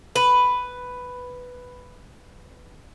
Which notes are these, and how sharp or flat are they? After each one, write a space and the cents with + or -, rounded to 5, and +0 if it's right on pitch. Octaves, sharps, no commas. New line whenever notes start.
B4 +5